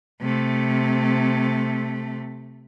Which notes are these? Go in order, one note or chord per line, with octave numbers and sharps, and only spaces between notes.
C3 A3